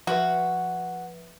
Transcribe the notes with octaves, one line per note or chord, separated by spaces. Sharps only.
F3 F#4 B4 E5